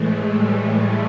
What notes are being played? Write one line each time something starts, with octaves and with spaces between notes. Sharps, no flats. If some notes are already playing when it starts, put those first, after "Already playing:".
Already playing: A2 E3 G#3 A3
G3
G3